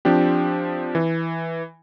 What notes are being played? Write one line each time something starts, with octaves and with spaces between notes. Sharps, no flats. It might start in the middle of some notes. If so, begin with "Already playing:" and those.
F3 C4 D4 G4
E3